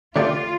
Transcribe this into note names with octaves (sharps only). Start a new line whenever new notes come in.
D3 A3 D4 F4 G4 D5